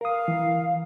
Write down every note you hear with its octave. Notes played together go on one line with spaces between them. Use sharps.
A#4 F5 D#6
E3